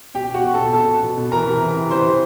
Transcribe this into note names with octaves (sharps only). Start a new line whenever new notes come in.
B2 G4 G5
B2
F#4 F#5
B2
B2 A4 A5
B2 A4 A5
B2
B2
B2
E3 A#4 A#5
C3
E3
C3
E3 C5 C6
C3